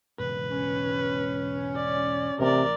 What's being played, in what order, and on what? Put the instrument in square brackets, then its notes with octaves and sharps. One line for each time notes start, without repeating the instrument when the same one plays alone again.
[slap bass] E1 G#2 C#3 [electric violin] B4
[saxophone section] C#4
[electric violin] D5
[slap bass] A1 [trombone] C3 [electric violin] A#4 D5